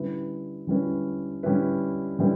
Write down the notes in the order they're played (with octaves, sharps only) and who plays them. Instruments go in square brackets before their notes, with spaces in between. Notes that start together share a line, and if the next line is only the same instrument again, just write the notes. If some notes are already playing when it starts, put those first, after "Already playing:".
Already playing: [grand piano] D3 G3 C#4 E4 B4
D3 G3 C#4 E4 B4
D3 G3 C#4 E4 B4
D3 G3 C#4 E4 B4